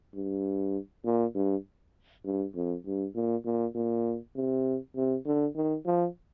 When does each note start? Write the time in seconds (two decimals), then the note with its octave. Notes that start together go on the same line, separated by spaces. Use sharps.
0.14 G2
1.05 A#2
1.35 G2
2.25 G2
2.55 F2
2.85 G2
3.15 A#2
3.45 A#2
3.75 A#2
4.35 C3
4.96 C3
5.25 D3
5.55 D#3
5.86 F3